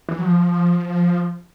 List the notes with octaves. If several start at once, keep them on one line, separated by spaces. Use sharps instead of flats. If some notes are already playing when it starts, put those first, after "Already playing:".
E3
F#3
F3